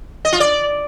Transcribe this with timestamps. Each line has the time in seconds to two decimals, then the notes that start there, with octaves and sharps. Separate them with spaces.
0.25 D#5
0.33 F4
0.40 D5